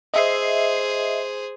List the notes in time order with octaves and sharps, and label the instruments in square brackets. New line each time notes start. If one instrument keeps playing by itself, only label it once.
[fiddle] G#4 C5 [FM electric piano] D#5 E5 C7